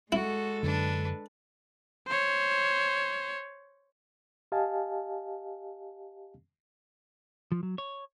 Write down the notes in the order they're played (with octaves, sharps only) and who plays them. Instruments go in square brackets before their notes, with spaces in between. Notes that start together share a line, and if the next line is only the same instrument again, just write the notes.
[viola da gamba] G#3 A4 [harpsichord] E4 [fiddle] F#4
[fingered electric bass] F#2 D3 [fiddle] D4 B4
[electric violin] C5 C#5
[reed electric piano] G4 D#5 F5 G#5 A5
[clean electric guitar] F3
F#3
C#5